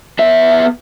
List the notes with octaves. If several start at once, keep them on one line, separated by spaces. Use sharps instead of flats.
B3 E5